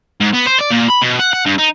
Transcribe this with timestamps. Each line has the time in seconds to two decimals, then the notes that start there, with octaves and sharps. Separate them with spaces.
0.20 G#2
0.33 B3
0.46 C5
0.59 D5
0.70 A#2
0.88 B5
1.02 B2
1.19 F#5
1.33 F#5
1.46 G2
1.59 D#4